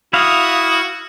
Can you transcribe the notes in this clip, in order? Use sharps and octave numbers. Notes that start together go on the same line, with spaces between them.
E4 F#4 F5 D#6